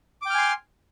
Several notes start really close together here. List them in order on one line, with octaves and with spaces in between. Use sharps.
D6 G5 F6 G#5 C6